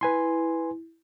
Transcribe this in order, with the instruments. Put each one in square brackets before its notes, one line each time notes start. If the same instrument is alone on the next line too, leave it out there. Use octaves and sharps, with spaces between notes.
[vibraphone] E4 [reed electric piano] B4 G#5 C6